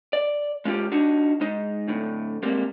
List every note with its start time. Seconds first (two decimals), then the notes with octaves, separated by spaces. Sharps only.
0.13 D5
0.65 G#3 C#4 F4 G4
0.92 D4 D#4 F#4
1.41 G#3 D#4
1.87 D2 A2
2.43 G3 G#3 A#3 C4